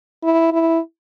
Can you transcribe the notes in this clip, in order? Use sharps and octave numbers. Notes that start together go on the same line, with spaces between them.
E4
E4